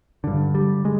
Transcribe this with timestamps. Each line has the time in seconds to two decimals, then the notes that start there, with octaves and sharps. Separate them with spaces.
0.24 G2 D3
0.55 G3
0.85 G#3